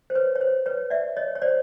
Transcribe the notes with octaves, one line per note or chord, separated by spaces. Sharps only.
C5
B4 C#5
C#5
C5
B4 C#5
D5 E5
C#5 D#5
C#5
C5 D5